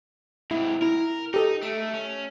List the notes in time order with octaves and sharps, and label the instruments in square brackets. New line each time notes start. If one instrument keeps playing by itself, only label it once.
[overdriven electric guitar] G#2 C3 [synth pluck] E4
[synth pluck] E4 [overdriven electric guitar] A#4
[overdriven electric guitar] D#4 [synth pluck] G4 A4 D#5
[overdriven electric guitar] A3 [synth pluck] D7
[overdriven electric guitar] C#4